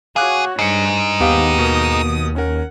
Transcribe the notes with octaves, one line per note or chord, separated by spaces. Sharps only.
F#4 G#4 C#5 F5 D6 F#6
G2 D#4 G#4 C7 C#7
D#2 B3 G4 F5 D#6
B2 A#3
C#4 A#4 F#5